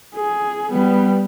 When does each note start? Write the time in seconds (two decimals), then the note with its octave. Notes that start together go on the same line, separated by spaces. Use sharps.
0.16 G#4
0.72 G3 B3